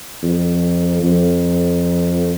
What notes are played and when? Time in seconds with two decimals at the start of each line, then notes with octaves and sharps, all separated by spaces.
0.23 F2
1.03 F2